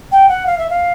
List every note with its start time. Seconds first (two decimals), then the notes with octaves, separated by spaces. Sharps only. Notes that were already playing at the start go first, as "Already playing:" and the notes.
0.11 G5
0.28 F#5
0.46 F5
0.58 E5
0.69 F5